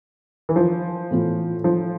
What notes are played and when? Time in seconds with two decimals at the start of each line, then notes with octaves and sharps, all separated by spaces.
0.49 E3
0.56 F3
1.11 A2 E3 B3 F4
1.64 F3